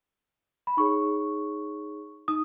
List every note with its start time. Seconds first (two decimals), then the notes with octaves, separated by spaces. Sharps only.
0.67 B5
0.77 D#4 G#4 C#5 C#6
2.28 D#4 D#6